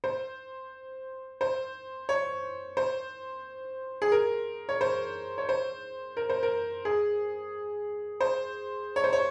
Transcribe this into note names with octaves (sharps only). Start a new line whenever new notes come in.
C5
C5
C#5
C5
G#4
A#4
C#5
C5
C#5
C5
A#4
C5
A#4
G#4
C5
C#5
C5
C#5